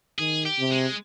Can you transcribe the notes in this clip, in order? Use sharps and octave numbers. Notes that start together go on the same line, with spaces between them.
D#3 G#4
G4
C3
G#3